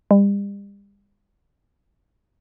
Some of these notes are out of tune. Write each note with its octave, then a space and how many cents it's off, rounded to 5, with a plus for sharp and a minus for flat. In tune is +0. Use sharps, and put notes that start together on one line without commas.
G3 +40